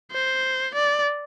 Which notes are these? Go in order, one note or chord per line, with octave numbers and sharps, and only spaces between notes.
C5
D5